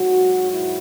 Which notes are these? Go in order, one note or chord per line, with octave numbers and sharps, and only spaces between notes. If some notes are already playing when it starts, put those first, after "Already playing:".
Already playing: G#2 F#3 F#4
E4